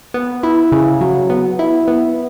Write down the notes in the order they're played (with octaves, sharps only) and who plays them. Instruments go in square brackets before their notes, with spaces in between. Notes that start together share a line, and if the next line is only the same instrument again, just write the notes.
[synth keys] B3
E4
C#3
F#3
B3
E4
B3